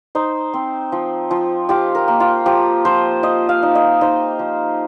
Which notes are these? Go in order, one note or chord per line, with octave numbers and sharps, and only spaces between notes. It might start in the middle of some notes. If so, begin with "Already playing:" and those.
D#4 C5
C4
F3
F3
F4 G4
A#4
A#3
F4
F3 G4
F3 C5
F3 D#5
F5
D#4
D#5
D#4 C5
F3